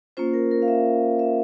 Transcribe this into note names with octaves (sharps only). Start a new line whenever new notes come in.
A#3 C#4 F4 C5
A#4
A#4
F5
E5
E5